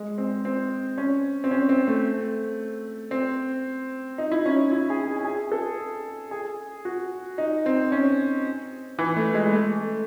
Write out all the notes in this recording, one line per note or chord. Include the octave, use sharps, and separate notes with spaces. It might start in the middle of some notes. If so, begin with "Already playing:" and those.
Already playing: G#3
C4
C4
C#4
C4
C#4
C4
A3
C4
D#4
E4
C#4
E4
G#4
G#4
G#4
A4
G#4
F#4
D#4
C4
C#4
E3
A3
G#3
A3